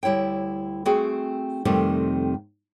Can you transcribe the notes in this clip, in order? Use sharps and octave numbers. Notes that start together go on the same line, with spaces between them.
D2 G3 E4 C#5 G5
A3 C4 F#4 G#4 G5
F2 C3 D#3 G3 A3 C4